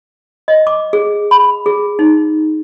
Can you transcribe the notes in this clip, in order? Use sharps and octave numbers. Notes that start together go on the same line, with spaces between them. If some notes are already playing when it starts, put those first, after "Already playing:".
D#5
D6
G#4
B5
G#4
D#4